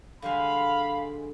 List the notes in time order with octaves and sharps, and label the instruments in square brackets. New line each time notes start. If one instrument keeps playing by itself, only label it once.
[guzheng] D3 G3 G#3 [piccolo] F5 [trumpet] B5